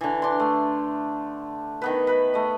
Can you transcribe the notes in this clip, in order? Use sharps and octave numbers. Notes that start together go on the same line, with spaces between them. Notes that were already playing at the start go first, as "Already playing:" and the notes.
D3 E3
D4 C6
A3
D#3 B3 B4
B4 B5
A3 D#5